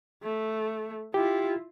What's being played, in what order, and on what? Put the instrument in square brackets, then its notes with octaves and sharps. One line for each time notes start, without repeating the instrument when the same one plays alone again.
[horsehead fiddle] A3
[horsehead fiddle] E4 F4 [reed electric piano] G4